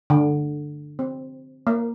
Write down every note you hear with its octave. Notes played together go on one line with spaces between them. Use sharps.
D3
C4
A#3